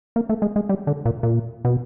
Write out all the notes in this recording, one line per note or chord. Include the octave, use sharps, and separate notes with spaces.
A#3
A3
G#3
G#3
G3
D3
A#2
A#2
B2